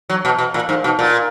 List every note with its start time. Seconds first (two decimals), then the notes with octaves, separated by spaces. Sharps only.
0.09 F#3
0.25 B2
0.39 B2
0.54 A#2
0.69 G#2
0.84 B2
0.99 A#2